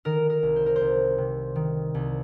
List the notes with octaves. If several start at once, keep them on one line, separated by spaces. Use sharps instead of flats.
D#3 A#4
A#4
C2
C5
A#4
C5
C2
C3
D#3
C2